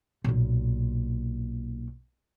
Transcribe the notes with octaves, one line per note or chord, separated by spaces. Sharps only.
B1 A#2